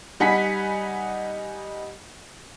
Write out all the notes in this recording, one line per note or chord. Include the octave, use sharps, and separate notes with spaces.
G3 D#4 F#5 G#5 B5 B6